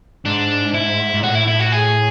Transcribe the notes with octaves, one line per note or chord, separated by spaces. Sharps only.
G#2 D4
E4
G#2
A2 F#4
E4
E4
F#4
G#4